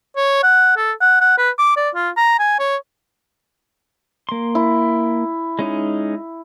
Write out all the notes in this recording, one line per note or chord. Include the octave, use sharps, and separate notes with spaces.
C#5
F#5
A4
F#5
F#5
B4
D6
D5
F4
A#5
G#5
C#5
A#3 C6
E4
G#3 C#4 D#4